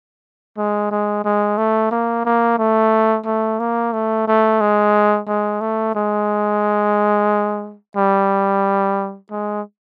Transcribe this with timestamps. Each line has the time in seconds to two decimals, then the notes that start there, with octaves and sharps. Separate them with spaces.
0.57 G#3
0.91 G#3
1.24 G#3
1.58 A3
1.91 A#3
2.25 A#3
2.58 A3
3.26 A3
3.59 A#3
3.93 A3
4.27 A3
4.61 G#3
5.27 G#3
5.61 A3
5.95 G#3
7.97 G3
9.31 G#3